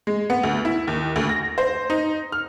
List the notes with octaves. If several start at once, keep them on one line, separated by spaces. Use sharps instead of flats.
G#3
B3
D2
E4
D#2
D2
A#6
C5
D#4
F6